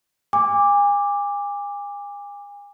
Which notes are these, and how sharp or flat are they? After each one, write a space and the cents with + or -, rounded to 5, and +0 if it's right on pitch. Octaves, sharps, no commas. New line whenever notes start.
G#5 -35 D6 +0